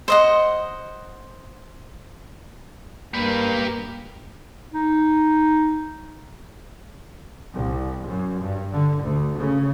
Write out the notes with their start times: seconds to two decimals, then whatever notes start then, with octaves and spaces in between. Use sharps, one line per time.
0.08 C5 D#5 F#5
3.14 G2 A#3 G4 B4
4.73 D#4
7.54 C2
8.06 F#2
8.41 G2
8.72 D3
9.02 D2
9.39 C#3